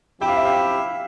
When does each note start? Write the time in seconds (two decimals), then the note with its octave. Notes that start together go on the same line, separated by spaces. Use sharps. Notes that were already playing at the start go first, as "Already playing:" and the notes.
0.20 F3 C4 E4 G4 G5
0.29 F5
0.37 E5
0.45 F5